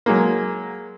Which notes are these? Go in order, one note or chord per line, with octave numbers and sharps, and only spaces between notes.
F#3 G#3 A#3